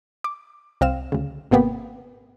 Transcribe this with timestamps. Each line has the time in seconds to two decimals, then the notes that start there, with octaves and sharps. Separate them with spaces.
0.24 D6
0.81 C2 C4 F5 E7
1.12 D2 C#3
1.51 G#1 C3 A#3 B3 G4 B5